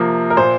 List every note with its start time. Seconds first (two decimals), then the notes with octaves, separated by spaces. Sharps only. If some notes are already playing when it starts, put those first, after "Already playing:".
Already playing: C3 F3 A#3
0.30 A#4
0.37 A#2 C5